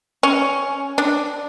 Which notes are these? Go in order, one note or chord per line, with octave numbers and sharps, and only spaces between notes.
C#4
D4